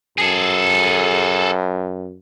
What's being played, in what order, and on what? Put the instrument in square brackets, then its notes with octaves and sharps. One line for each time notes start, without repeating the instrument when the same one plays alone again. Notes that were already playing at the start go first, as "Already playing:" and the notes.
[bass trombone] F#2 [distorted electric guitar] G#4 A4